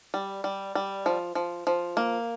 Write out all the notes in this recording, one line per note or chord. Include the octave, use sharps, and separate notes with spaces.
G3
G3
G3
F3
F3
F3
A#3